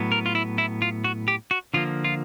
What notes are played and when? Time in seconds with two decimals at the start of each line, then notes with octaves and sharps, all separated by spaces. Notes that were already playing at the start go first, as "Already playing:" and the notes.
Already playing: A2 F#3 B3
0.12 A#4
0.26 F4
0.35 E4
0.58 E4
0.82 F4
1.04 F#4
1.28 G4
1.51 F#4
1.74 D3 F3 A#3 F4
2.04 F4